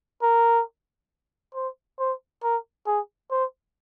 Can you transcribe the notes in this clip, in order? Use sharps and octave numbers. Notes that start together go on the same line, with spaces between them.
A#4
C5
C5
A#4
G#4
C5